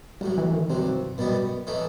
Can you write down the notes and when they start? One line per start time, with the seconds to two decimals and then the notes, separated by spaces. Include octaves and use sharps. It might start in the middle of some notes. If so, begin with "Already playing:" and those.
0.21 B1 A2 F#3 G3
0.38 E3
0.54 D#3
0.70 G2 C3 F#3 C4
1.18 F#2 B2 D#3 G3 B3
1.67 A2 E3 A3 D#4